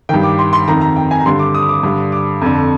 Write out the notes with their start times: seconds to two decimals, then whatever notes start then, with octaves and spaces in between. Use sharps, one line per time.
0.09 G2 D#3 G5
0.23 D6
0.39 C6
0.53 C6
0.68 F2 D#3 A#5
0.81 A#5
0.96 G5
1.11 G#5
1.20 A#5
1.25 G2 D3 C6
1.39 D6
1.54 D#6
1.69 D6
1.83 G2 D3
2.12 D6
2.41 F2 D3